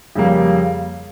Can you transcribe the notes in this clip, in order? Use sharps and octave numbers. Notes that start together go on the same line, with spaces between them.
F2 C#3 G3 A#3